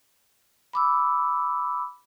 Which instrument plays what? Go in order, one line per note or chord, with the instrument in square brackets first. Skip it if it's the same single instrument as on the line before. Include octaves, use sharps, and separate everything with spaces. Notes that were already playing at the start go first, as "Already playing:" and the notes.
[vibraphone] B5 D6 E6